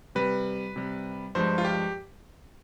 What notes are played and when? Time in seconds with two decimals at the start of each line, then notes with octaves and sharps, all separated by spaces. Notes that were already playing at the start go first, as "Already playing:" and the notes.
0.15 C3 G3 B4
0.76 C3 G3
1.35 G2 F3 G#3 C5
1.58 F4
1.65 G4